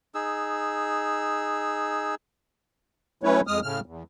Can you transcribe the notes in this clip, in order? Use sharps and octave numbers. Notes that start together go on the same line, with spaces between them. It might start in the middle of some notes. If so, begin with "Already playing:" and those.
D#4 G#4 E6
F#3 A3 C#4 E4 B4 C#5
F2 G#3 D#6 F6
A2 C#3 F6
E2